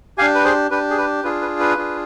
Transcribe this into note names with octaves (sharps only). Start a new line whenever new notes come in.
D4 G4 F5 G#5
B4
G#4 C5
D4 G4 B4
G#4
B4
D4 F4 G#4 B4
B4
B4
D4 F4 G#4